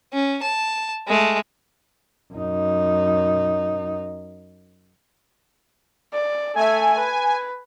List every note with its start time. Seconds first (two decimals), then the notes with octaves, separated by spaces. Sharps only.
0.13 C#4
0.43 A5
1.08 G#3 A3
2.34 F#2 D#4
6.13 D5
6.55 A3 E5 G#5
6.98 B4